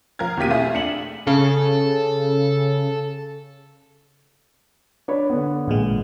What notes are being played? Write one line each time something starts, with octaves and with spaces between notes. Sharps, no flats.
F3 A#4 F5 F6 G#6
E2 B2 A#3 G4 B6 D#7
A3 E4 F4 G#4
D4 C#7 E7 F#7
C#3 A4
D4 C#5 B5
D3 B3
A1 A#2 G#3